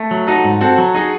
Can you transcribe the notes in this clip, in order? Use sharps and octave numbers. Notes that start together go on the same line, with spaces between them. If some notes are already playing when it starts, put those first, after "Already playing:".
Already playing: A3
F#3
D#4 F#4 A4
G#2
C4 F#4 A4
F#3
D#4 G#4